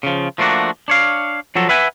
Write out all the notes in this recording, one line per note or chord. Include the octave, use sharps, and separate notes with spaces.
C#3 F3
F3 A3 A#3 D4 F#4
D4 C#5 F5
F3 F#3 F#4 A4
B4 E5 F#5 G#5